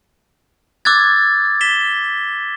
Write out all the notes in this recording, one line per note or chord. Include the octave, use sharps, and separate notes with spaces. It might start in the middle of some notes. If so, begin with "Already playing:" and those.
D6 E6 F#6 G#6 A6
B6 E7 G7